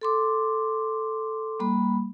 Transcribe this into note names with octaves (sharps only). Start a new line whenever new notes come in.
A4 C6 D6
G3 A#3 B5